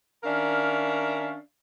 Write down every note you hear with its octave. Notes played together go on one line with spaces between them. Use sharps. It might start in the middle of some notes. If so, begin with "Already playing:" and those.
D#3 C#4 D4 A#4 E5 F5